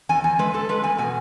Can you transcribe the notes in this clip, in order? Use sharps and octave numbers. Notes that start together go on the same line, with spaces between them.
E2 G#5
E2 G#5
G#3 B4
G#3 A4
G#3 B4
E2 G#5
B2 G#5